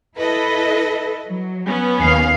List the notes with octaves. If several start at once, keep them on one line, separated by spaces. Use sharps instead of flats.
E4 A4 B4 D#5
F#3
B3 C#4
D#2 F5